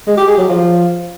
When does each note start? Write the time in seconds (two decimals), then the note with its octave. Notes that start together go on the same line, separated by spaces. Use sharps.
0.07 G#3
0.17 G4
0.27 G#4
0.38 F#3
0.48 F3